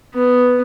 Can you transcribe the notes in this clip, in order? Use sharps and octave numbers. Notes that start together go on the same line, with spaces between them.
B3